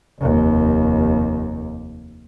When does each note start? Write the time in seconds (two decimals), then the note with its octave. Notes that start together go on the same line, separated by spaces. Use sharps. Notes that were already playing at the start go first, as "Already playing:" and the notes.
0.20 F1 D#2